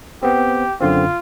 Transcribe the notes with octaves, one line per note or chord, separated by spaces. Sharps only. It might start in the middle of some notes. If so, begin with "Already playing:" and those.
B3 C4 G4
F#2 D3 C4 F4